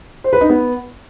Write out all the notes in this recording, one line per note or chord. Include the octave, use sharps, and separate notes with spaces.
C5
B4
D#4
B3